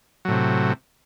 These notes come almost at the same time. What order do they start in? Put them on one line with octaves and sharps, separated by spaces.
F#3 A2 C3